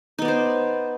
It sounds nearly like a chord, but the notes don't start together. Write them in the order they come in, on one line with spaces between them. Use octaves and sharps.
D#4 B3 D5 C5